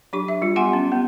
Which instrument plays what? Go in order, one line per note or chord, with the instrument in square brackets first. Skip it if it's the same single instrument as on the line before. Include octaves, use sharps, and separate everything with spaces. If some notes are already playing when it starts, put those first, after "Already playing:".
[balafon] F#3 D4 G4 C#6
E5
G3 F4
B3 G4 F#5 G#5 C6
C#4
B3